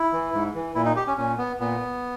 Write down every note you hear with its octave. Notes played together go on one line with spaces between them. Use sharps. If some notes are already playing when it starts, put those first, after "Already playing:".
Already playing: E4
E3
G#2
E3
A#2 E4
D#4
G4
C#4
A#2 C#4
B3
A#2 B3